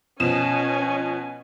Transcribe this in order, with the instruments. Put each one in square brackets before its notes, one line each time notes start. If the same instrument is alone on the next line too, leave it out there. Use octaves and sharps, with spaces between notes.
[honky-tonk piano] B2 F3 E7 [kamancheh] C#4 G#5